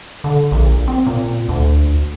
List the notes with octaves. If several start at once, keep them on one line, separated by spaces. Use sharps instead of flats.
D3
A#1
C4
A#2
D2